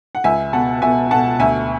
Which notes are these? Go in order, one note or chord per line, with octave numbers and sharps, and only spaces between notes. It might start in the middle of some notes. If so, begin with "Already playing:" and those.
F#5
C#2 E5 G#5
B2 F#5 A5
B2 E5 G#5
B2 F#5 A5
D2 E5 G#5